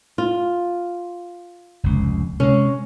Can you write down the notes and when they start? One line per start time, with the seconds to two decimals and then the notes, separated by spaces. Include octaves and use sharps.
0.18 F4
1.84 F1 C#2
2.40 C3 G#3 C#4